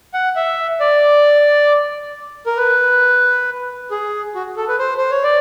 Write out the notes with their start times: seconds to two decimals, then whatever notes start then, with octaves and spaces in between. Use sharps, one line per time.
0.14 F#5
0.36 E5
0.80 D5
2.46 A#4
2.57 B4
3.91 G#4
4.35 F#4
4.57 A4
4.68 B4
4.79 C5
4.98 C5
5.10 C#5
5.23 D5